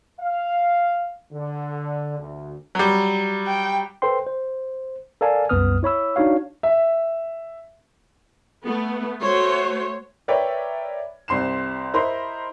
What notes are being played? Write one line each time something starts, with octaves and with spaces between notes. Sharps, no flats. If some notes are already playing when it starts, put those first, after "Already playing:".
F5
D3
D2
F#3 G3
G5
A4 B4 C5 G5 C6
C5
A4 A#4 D5 F5 G#5 A5
C2 F#2 B3 B4 D#6 F6
E4 C#5 B5 E6
D4 D#4 F#4 C#5 F5
E5
A3 B3
A3 F#4 C5 C#5
A#4 B4 C#5 D5 E5 G5
C2 C4 C6 C7 E7
E4 A#4 C5 D#5 B5 C6